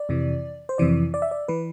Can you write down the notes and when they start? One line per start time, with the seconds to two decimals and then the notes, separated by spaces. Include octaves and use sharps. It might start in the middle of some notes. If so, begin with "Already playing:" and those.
Already playing: D5
0.09 F2 C3 E3
0.69 C5
0.78 F2 C3 E3 D5
1.14 D5
1.22 E5
1.31 D5
1.48 E3 B4